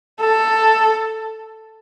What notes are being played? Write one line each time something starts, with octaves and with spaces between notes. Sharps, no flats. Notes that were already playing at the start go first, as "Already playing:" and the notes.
A4